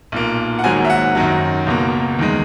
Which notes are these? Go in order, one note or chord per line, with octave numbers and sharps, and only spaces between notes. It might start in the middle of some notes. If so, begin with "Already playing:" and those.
B1 A#2 A#3
F#5
G#1 G#2 F#3 A#3 G#5
E5
F#5
F#2 D#3 F#3
C#2 B2 A#3
E2 D#3 G#3